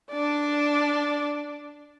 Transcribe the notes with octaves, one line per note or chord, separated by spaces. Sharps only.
D4 D5